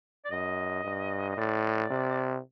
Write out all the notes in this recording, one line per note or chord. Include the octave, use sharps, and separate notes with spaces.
D5
F#2 D#5
G2
D#5
A2 D5
C3